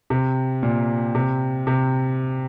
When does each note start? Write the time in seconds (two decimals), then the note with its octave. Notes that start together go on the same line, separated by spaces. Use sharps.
0.10 C3
0.63 A#2
1.15 C3
1.67 C3